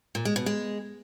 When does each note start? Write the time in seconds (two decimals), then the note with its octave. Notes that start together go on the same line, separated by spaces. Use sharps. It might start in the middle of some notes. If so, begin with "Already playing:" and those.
0.15 A#2
0.25 G#3
0.36 B2
0.46 G#3